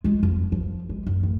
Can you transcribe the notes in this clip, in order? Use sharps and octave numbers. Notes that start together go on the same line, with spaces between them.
G#3 F4
F2
F3
G#3
F#2
A1